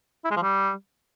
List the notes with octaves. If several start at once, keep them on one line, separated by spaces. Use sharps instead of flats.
E4
G#3
F3
G3